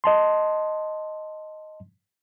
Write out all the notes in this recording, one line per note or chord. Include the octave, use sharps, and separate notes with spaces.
D#5 A5 C6